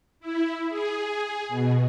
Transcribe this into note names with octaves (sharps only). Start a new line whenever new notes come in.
E4
G#4
B2